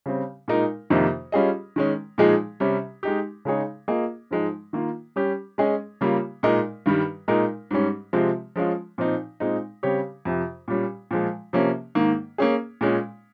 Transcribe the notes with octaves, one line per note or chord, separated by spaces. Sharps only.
C#3 G3 C4
A#2 G#3 D#4 A#4
F2 C3 D#3 A#3 D#4
G3 C#4 F4 G#4 D#5
D#3 G#3 C#4
A#2 F3 G#3 D#4 G#4
C3 G3 C#4
G#3 D#4 G4
C#3 G#3 D#4 G#4 C#5
A#3 F4 G#4 D#5
G#2 F3 G#3 D#4
D#3 A#3 F4
G3 C#4 G4
G#3 C#4 G#4 D#5
C#3 G3 A#3 F4
A#2 G#3 D#4 A#4 D#5
G2 D#3 G3
A#2 G#3 D#4 A#4
G#2 G3 C#4
C3 F3 G#3 C4 F4
F3 G#3 C#4 F4
A#2 F3 C4 D#4
A#2 G#3 C4 D#4
C#3 G3 C4 G4 C#5
F2 C3 F3
A#2 G3 C#4
A#2 F3 G#3
C3 F3 A#3 C#4
G#2 D#3 A#3
A#3 C#4 G#4
A#2 G#3 C#4